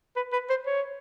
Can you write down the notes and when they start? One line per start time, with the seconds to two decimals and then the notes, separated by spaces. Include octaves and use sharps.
0.16 B4
0.33 B4
0.50 C5
0.66 C#5